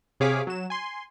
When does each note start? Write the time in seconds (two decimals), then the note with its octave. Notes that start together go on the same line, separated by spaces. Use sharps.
0.20 C3 G#4 C#5 F5 D6 B6
0.47 F#3 E7
0.70 G#5 C6